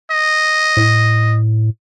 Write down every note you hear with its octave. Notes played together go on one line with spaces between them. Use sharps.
D#5
A2